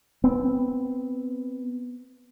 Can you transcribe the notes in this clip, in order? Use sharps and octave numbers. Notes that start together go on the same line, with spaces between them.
B3 C4